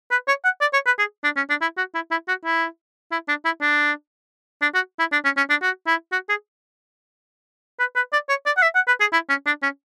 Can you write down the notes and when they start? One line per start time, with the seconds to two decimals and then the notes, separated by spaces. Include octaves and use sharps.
0.11 B4
0.28 C#5
0.44 F#5
0.61 D5
0.73 C#5
0.86 B4
0.99 G#4
1.24 D4
1.36 C#4
1.49 D4
1.61 E4
1.77 F#4
1.95 E4
2.11 E4
2.28 F#4
2.45 E4
3.12 E4
3.28 D4
3.45 E4
3.61 D4
4.62 D4
4.75 F#4
4.99 E4
5.12 D4
5.25 C#4
5.37 C#4
5.50 D4
5.62 F#4
5.87 E4
6.12 F#4
6.29 G#4
7.79 B4
7.96 B4
8.13 D5
8.29 C#5
8.46 D5
8.57 F#5
8.62 E5
8.75 F#5
8.88 B4
9.00 G#4
9.13 E4
9.29 C#4
9.46 D4
9.63 C#4